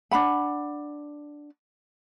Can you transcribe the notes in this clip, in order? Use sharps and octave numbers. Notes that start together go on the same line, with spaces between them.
D4 D#4 F#5 B5